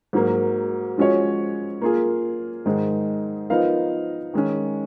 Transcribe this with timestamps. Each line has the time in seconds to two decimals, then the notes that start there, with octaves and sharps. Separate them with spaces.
0.13 G#2 F#3 A#3
0.98 F3 G#3 C#4 F#4 C#5
1.81 A#3 F4 G#4
2.65 G#2 D#3 G#3 D#4
3.50 F3 B3 D#4 A#4 F5
4.34 D#3 G#3 C#4